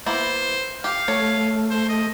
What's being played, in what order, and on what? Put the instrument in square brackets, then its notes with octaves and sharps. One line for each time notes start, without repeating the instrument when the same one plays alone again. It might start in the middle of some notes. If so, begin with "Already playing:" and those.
[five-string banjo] A#3 B3 E4 [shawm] C5
[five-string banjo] G4 [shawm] F5
[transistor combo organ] A3 [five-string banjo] C#5
[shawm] C5
D#5